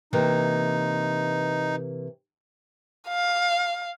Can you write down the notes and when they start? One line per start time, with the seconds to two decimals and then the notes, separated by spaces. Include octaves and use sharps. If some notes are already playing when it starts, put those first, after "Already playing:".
0.13 C3 E3 A#3 D#4
3.09 F5